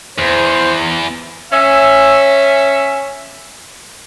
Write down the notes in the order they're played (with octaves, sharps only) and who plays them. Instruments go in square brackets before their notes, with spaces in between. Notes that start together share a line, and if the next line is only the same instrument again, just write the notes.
[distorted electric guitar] E2 [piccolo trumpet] C5
[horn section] C#4 E5